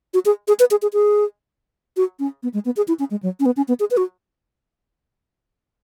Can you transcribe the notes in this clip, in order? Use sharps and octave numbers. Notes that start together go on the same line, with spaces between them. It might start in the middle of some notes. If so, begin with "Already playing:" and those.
F#4
G#4
G#4
B4
G#4
G#4
G#4
F#4
C#4
B3
G#3
B3
G#4
E4
C#4
G#3
F#3
C#4
B3
C#4
B3
G#4
B4
F#4